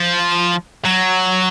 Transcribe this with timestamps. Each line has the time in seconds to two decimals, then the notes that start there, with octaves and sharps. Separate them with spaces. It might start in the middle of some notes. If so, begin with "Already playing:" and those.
Already playing: F3
0.85 F#3